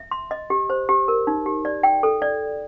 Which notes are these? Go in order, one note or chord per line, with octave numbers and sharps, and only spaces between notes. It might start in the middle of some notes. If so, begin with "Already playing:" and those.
Already playing: E5
C6
D#5
G4
C5
G4
A#4
D#4
G4
D5
G5
A4
D5